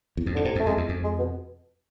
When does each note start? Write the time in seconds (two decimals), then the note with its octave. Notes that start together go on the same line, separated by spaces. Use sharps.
0.17 E2
0.26 F2
0.35 G#2 D3
0.44 A2 C3
0.56 F2
0.60 A3
0.66 F2 G#3
0.77 E2
0.89 F2
1.04 G#3
1.19 B2